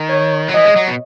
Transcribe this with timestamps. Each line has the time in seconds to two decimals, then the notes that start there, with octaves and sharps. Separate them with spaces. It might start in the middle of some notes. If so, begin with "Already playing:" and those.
Already playing: D#3
0.09 C#5
0.48 F#3
0.54 E3 D#5
0.65 G#3
0.76 F#3
0.87 B2